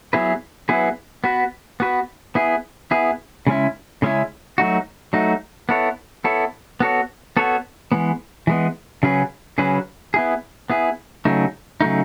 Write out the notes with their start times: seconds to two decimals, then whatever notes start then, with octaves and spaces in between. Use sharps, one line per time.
0.13 F#3 B3 E4 G#4 B4
0.69 F#3 B3 E4 G#4 B4
1.24 B3 F#4 B4
1.80 B3 F#4 B4
2.35 B3 E4 G#4
2.91 B3 E4 G#4
3.47 C#3 G#3 C#4 E4
4.02 C#3 G#3 C#4 E4
4.58 F#3 A3 D#4 F#4
5.13 F#3 A3 D#4 F#4
5.69 B3 E4 A4 C#5
6.24 B3 E4 A4 C#5
6.80 B3 F#4 A4 C#5
7.37 B3 F#4 A4 C#5
7.92 E3 G#3 B3
8.47 E3 G#3 B3
9.03 C#3 F#3 C#4 G#4 B4
9.58 C#3 F#3 C#4 G#4 B4
10.14 B3 E4 G#4
10.70 B3 E4 G#4
11.25 C#3 F#3 A3 D#4
11.81 C#3 F#3 A3 D#4